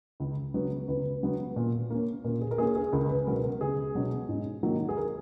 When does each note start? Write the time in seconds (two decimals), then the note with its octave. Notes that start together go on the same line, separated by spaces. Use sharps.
0.20 C#2
0.54 C#3 F#3 B3
0.88 C#2 B4
1.22 C#3 F#3 B3
1.56 A#2
1.90 A#3 C#4
2.24 A#2 A#4
2.41 G#4
2.51 A#4
2.58 A#3 C#4 G#4
2.75 G#4
2.92 C#2 A#4
3.09 B4
3.27 B2 F#3 C#4 A#4
3.43 A#4
3.61 C#2 G#4
3.95 B2 F#3 C#4
4.29 G#2
4.63 D#3 F#3 A#3
4.89 G#4
4.97 A#4